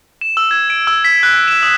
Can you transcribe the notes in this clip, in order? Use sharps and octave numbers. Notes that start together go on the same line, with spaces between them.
E7
E6
G#6
D7
E6
B6
F#6
E7
D#6